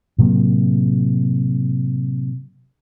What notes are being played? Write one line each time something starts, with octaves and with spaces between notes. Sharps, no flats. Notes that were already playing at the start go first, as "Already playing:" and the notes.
A2 C3 F#3 A#3